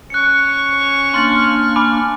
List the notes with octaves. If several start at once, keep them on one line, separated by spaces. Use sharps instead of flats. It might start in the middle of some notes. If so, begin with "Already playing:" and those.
C#4 C#6 F#6 C#7
A#3 D4 C6 F6 A6 F#7
G#5 B5 D6